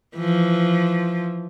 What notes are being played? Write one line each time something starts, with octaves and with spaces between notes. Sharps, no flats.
E3 F3